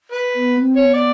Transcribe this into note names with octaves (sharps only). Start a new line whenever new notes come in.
B4
B3
C4
C#5
B3
D5